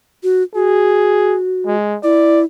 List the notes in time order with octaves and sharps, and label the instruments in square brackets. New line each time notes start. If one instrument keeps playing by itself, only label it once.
[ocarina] F#4
[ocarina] F#4 [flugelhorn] G#4
[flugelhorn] G#3
[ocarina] E4 [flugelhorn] D5